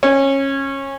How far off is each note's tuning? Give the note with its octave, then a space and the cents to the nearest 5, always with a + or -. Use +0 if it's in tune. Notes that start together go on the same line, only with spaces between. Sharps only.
C#4 -20